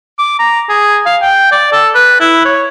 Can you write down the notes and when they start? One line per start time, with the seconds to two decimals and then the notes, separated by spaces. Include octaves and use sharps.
0.19 D6
0.39 A#5
0.69 G#4
1.06 F5
1.22 G5
1.52 D5
1.72 A4
1.95 B4
2.20 E4
2.45 C#5